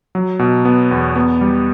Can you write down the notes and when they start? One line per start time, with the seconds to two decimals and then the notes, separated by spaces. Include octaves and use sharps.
0.15 F#3
0.39 B2
0.65 B3
0.91 E2
1.16 B3
1.41 G3